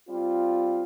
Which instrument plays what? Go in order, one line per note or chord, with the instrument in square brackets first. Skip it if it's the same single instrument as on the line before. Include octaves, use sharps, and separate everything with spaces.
[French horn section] G3 C4 F4